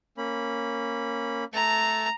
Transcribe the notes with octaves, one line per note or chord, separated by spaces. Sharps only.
A#3 C#4 B5
A3 A5 A#5